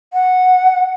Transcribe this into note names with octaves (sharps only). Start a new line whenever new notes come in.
F#5